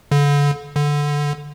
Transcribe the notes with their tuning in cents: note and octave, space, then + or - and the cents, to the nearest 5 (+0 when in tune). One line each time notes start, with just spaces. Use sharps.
D3 -35
D3 -5